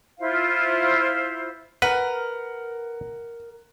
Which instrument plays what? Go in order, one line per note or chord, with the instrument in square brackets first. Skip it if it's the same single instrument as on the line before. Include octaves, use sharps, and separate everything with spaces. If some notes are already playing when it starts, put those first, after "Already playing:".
[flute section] E4 F4 C5 F5
[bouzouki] A#4 [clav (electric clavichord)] B4 [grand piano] F#5